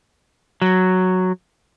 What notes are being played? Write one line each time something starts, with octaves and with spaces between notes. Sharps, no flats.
F#3